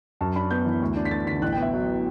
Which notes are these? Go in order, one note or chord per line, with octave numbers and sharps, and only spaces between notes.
F#2 A5
D4 B5
B3 G6
E3
D2
D4
B6
A3 A6
D3 B6
A1 F#6
G5
B3
E5
F#3